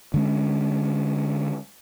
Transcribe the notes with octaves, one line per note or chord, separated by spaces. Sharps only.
D3 G#3 C#4